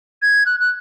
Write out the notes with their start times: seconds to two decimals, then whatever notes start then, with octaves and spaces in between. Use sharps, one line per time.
0.22 G#6
0.46 F#6
0.60 F#6